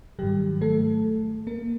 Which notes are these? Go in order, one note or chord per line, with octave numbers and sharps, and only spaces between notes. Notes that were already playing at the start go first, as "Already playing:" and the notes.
G#2 D#3 F#3 G3 G4
A3 A4
A#3 A#4